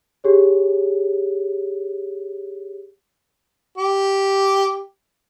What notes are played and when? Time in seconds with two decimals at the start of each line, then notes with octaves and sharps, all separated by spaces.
0.24 G4 G#4 C#5
3.78 G4